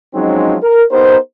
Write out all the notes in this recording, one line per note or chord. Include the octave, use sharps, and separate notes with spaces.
F3 F#3 G#3 C4 C#4 D#4
A#4
B3 D#4 G4 A#4 C5